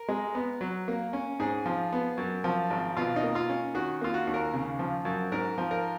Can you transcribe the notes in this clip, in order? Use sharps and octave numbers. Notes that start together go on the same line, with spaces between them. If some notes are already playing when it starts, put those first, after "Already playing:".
Already playing: A#4
G#3
B3
F#3
A#3
C#4
G#2 G#4
F3
B3
F#2
F3
G#1
B2 F4
D#4
A#3
F4
C#4
D#3 F#4
A#3 F4
F#4
D#2
A#4
C#3
F3
F#2
G#2 A#4
F3
A#4